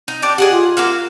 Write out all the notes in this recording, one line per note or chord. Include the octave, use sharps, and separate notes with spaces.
D#4
D4 G4 D5
G4 G#4 D#5 F#5
F4
A#3 F#4 F5